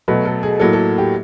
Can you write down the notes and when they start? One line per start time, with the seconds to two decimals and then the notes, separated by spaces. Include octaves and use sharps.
0.08 B2 F#3 A3 B4
0.25 A4
0.43 G#4
0.60 A2 F#3 A#3 A4
0.73 A4
0.98 G4